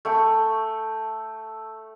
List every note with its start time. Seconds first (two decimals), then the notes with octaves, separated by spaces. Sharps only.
0.05 A3 G5 C#6